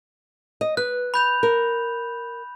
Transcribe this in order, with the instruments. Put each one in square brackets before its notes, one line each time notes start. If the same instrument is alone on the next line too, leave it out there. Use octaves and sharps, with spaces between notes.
[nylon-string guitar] D#5
[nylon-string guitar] B4 [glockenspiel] F#6
[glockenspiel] B5 G6 F7
[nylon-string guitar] A#4